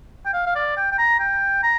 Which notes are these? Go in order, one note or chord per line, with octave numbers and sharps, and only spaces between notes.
G5
F5
F5
D5
G5
G5
A#5
G5
A#5